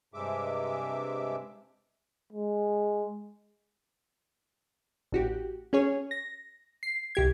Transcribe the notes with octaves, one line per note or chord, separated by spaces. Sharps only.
G2 C3 G#3 E5 D6
G#3
A1 F#4 G4
C#4 G#4 C#5
A#6
C7
C2 G4 G#6